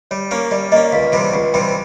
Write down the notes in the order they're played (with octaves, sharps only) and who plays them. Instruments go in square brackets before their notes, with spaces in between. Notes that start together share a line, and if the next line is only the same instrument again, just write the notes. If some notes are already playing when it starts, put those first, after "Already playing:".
[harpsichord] G3 [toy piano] C#5
[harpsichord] A#3 C#4
[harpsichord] G3 [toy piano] D5
[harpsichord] A#3 C#4 [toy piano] D#5
[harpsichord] C#2 [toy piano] F5
[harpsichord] C3 E3 G3
[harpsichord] C#2 [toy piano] F#5
[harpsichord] C3 E3 G3 [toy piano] G5